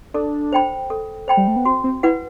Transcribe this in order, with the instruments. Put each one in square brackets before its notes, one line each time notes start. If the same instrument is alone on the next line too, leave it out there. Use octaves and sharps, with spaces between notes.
[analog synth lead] D4 [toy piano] A4
[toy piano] C5 G5 B5
A4
C5 G5 B5
[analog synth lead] G3
A3
B3
[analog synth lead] C4 [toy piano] F#4
[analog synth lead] C4
[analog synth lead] E4 [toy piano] B4 F#5